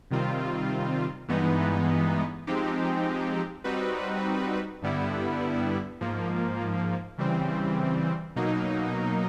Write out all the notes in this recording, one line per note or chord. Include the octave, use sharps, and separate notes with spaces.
C3 D#3 G3 C4 F4
G2 E3 G#3 B3 D#4
F3 G#3 C4 D#4 G4
G3 C4 D#4 F#4 B4
G2 D3 G3 B3 E4
G#2 F3 A#3
C#3 E3 G3 C4
B2 F#3 A#3 D#4